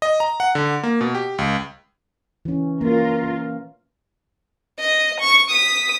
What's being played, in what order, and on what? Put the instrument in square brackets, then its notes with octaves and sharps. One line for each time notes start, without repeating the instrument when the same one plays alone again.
[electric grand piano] D#5
A#5
F#5
D3
A#3
B2
G4
C#2
[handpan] E3 C#4
[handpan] A#3 [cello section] F4 A#4
[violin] D#5
C#6
D#6 B6